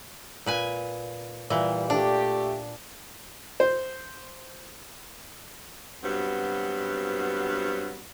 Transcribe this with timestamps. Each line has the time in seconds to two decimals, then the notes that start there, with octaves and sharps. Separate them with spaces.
0.46 A#2 B4 G#5
1.50 A#2 E3 G3
1.90 A3 D4 G4
3.60 C5
6.03 G2 F#3 B3 C4 F#4